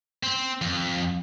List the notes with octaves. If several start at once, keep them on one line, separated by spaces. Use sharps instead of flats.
C4
F2